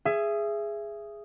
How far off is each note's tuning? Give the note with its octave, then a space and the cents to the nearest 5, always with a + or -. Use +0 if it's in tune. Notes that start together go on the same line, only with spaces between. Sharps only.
G#4 +0 E5 +25